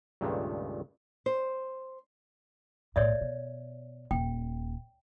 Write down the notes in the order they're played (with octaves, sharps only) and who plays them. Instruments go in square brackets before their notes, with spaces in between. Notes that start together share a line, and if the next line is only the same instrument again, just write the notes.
[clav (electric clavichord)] C#2 G2 A#2 D#3 G#3 A3
[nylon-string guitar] C5
[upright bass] B1 A2 [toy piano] C#5 D5 E5
[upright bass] B2
[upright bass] D#1 [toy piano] G5